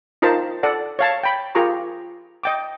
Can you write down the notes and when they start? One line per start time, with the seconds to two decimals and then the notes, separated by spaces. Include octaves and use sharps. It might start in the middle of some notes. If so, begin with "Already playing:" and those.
0.22 D#4 F4 A#4 C5 A5
0.63 A4 D5 F#5
0.99 C#5 F5 A5
1.23 G5 B5
1.55 F4 G4 G#4 A#4 A#5 C#6
2.43 D#5 G5 D6